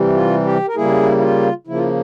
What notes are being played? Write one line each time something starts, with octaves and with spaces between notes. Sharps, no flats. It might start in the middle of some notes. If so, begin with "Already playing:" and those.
Already playing: C3 E3 G3
F4
G4
A#4
C#3 G3 A#3 E4 G#4
E4
F4
C#3 F3 A#3 E4
F4
E4